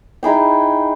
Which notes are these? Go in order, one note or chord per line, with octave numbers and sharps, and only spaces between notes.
D#4 E4 G#4 G5